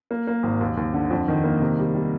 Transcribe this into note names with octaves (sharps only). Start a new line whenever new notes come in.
A#3
A#3
G#1
D#2
D#2
D3
F2
D#3
A#3
C3
G3
G3